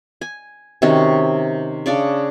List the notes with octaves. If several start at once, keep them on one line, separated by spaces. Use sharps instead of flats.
G#5
C3 D#3 C#4 F#4
C#3 D4 D5 C#6